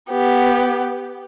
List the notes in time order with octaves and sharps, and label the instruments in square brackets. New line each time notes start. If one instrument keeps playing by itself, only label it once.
[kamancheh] B3 G4